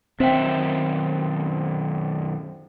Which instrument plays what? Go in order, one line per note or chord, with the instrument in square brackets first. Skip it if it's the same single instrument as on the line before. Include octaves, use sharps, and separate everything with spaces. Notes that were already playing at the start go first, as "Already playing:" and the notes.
[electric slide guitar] F#2 D#3 E5 [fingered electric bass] C4 [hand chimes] C5 G5